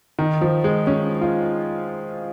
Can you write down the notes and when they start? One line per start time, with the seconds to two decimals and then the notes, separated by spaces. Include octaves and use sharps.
0.19 D#3
0.41 F3
0.64 G#3
0.87 C#4
1.21 F4